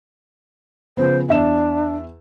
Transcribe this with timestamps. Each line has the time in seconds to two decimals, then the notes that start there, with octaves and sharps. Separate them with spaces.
0.97 C#3 F3 B3 C5
1.29 E2 D4 E5 E7